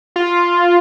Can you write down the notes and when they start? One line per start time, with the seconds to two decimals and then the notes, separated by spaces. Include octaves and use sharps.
0.16 F4